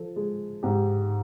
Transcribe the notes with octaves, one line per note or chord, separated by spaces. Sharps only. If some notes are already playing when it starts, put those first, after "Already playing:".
Already playing: F3 A4
G#3
G#2 G4